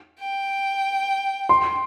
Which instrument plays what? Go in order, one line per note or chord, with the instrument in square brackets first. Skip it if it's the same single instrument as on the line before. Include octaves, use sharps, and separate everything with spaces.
[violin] G5
[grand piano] C6